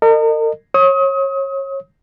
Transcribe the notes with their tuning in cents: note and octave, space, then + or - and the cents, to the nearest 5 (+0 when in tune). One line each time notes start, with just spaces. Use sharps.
A#4 -45 D#5 -30
C#5 -25 D#6 +35